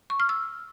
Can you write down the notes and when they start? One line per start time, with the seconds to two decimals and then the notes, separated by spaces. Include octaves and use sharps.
0.10 C#6
0.20 F6
0.29 E6